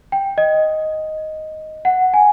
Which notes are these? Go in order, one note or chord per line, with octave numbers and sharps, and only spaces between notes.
G5
D#5
F#5
G#5